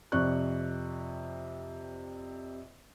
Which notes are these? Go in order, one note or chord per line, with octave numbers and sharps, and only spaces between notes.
F2 C3 D5 C#6 F#6